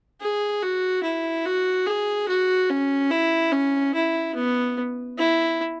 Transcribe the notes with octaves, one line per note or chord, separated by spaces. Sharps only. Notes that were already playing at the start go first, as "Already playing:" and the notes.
G#4
F#4
E4
F#4
G#4
F#4
C#4
E4
C#4
E4
B3
E4